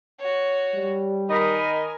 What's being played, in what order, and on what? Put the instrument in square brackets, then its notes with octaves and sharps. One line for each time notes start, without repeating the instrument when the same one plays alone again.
[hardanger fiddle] F#4 C#5
[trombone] G3
[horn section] D#3 D#5 B5 [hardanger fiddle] A#4 G#5